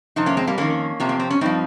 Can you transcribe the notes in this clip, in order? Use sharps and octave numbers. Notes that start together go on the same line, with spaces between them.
F2 C3 D#4
A#3 C#4
G#3 C4
G3 A#3
F2 D#3 A#3 C#4
F2 C3 F3
A#3
C4
C#4
G2 F3 C4 D#4